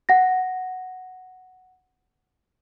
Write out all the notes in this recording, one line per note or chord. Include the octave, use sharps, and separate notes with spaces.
F#5 A#6